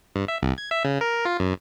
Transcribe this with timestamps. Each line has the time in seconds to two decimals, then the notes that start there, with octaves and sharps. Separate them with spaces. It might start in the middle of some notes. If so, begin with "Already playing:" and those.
0.16 G2
0.28 E5
0.43 C2
0.58 G#6
0.71 E5
0.85 C#3
1.01 A#4
1.25 F4
1.40 F#2